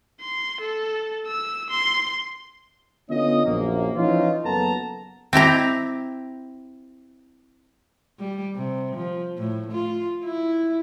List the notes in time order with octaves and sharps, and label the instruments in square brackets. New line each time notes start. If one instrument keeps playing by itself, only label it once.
[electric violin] C6
A4
E6
C6
[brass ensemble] D3 B3 C#4 F4 D#5
A#1 F#2 A#3
E3 F3 C#4 D#4 F4
F#1 F#2 B3 A4 A5 A#5
[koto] C4 E4 G4 A#5
[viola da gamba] G3
C3
F3
A2
F4
E4